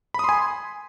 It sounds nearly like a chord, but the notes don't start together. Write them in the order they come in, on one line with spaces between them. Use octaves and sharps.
B5 D#6 C6 G#5